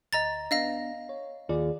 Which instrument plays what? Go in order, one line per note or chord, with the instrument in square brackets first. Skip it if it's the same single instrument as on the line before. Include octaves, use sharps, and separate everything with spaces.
[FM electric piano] D2 [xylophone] D#5 A#5 A6
[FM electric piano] B3 D4 [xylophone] D#5 F5 A#6
[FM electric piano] C#5
[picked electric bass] D#2 [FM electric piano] F4 G#4 D5